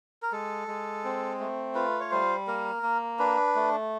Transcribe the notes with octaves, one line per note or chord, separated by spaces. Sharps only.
A#4
G#3 A4
G#3
C4
A3
F4 B4
C#5
G3 C5
A#3 A#4
A#3
D4 B4
A3